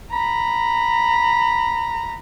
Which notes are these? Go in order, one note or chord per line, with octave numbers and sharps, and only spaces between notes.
A#5 B5